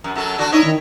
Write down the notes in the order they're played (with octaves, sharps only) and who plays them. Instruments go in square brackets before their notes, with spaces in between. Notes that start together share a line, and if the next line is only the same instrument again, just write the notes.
[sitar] F#2
F#2 F#3 A4
D3 D4 F#4
[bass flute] D#4 [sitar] E4 C#5 D#5
[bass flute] D#3